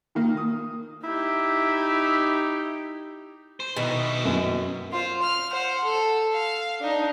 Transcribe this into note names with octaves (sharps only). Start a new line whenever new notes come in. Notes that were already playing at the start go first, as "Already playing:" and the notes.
D#3 A#3
D#6
D#4 E4 G4
C5
B2 D#3 E4
F#2
F4 C5
F6
C5 F#5
A4
F5
D4 D#4